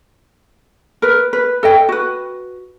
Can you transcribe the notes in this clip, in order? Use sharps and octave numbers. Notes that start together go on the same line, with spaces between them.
A#4 B4
B4
A4 D#5 G5
F#4 B4